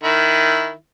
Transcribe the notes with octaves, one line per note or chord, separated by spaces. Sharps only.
D#3 E4